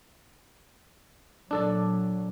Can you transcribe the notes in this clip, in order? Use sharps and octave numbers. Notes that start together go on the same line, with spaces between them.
A#2 F#3 D4 A4 D5